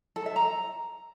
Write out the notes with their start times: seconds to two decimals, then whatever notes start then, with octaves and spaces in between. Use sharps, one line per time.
0.16 A4
0.26 E5
0.36 A#5